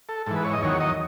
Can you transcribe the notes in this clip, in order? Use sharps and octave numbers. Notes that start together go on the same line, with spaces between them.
A4
G#2 E3 A4
B4
C#5
D#5
E2 D#3 F#3 C#5
D#5